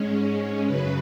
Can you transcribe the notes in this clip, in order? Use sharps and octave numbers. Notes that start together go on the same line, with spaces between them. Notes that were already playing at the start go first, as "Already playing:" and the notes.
Already playing: G#2 G#3 C#4
F#2 C#3 F#3 B4